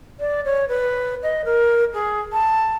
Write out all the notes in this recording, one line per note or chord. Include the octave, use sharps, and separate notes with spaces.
D5
C#5
B4
D#5
A#4
G#4
A5